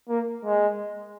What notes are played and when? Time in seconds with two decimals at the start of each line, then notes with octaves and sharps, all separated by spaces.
0.09 A#3
0.45 G#3